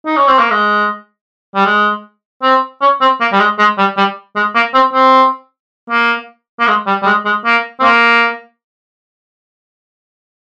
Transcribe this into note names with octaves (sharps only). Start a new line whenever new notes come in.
D#4
C#4
C4
A#3
G#3
G3
G#3
C4
C#4
C4
A#3
G3
G#3
G#3
G3
G3
G#3
A#3
C4
C4
A#3
A#3
G#3
G3
G3
G#3
G#3
A#3
C4
A#3